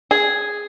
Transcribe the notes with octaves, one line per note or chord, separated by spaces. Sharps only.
G#4